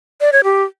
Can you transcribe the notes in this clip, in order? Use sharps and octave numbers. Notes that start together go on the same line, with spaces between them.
D5
C#5
G4